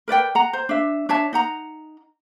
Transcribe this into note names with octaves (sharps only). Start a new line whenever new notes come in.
A#4 B4 D5 G5
F#5 A#5
C5
D4 E5
D4 C#5 E5 A5
D#4 F#5 A#5